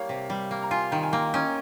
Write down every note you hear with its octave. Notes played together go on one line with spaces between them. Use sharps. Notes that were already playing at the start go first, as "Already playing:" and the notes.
Already playing: G3 A#3 C#5 F5
C3
G3
A#3
A#5
F4 G#5 C6
D#3 G5 A#5
G#5
A#3 G5 A#5
C#4 D#5 G5